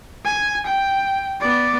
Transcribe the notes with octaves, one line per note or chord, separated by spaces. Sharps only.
G#5
G5
B3 D5